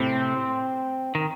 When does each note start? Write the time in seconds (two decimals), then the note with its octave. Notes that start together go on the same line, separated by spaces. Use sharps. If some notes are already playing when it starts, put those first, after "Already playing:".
Already playing: A2 C3 C4
1.15 D#3